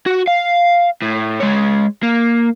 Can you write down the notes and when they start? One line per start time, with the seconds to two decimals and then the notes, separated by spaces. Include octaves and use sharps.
0.06 F#4
0.27 F5
1.02 A2
1.40 G#3 C#5
2.03 A#3